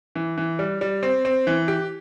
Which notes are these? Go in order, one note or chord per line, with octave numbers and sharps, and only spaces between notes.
E3
E3
G3
G3
C4
C4
E3
G4